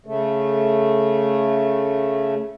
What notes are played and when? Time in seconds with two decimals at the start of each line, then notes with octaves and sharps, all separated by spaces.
0.06 C#3 A3